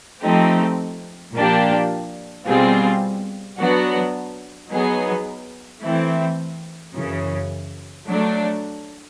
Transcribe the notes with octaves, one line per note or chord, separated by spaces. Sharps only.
F3 A3 C4 D#4 G4
A#2 F3 A#3 D4 G4
B2 G3 C4 F4 G#4
F#3 B3 D4 F#4
F#3 B3 D#4 G#4
E3 A3 C4 E4
F#2 C#3 E3
F#3 A3 D4